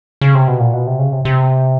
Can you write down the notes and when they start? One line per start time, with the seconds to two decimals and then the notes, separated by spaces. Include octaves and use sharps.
0.21 C#3
0.35 C3
0.48 B2
0.60 A#2
0.74 B2
0.87 C3
0.99 C#3
1.12 C3
1.25 C3